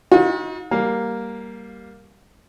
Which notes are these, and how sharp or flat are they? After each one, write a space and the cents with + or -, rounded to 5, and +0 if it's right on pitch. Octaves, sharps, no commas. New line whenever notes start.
D#4 +35 F#4 -45
G3 +0 A#3 +0 F5 +20